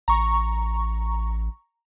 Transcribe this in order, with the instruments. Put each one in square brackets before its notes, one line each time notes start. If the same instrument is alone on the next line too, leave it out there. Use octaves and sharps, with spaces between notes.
[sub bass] A1 [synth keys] A#5 C#6